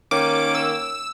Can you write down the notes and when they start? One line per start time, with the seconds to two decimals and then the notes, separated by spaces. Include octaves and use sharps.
0.11 D#3 A#3 C#4 D6
0.55 E6